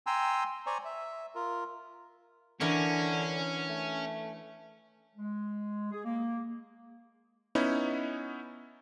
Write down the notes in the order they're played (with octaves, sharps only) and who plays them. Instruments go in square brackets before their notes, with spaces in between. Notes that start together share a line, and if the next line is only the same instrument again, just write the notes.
[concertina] G5 G#5 A#5 C6 E6
C5 D5 G#5 A#5 C#6
E5
F4 A#4
[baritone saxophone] D3 [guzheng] E3 D4 A#4 [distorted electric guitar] C#4
[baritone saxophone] A3
[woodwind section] G#3
G#4
A#3
[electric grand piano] B3 C#4 D#4 E4